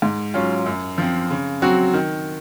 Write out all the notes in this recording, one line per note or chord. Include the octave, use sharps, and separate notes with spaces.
G#2
F#3 C#4 F4
F#2
F3 C4
C#3
F#3 C4 F#4
D#3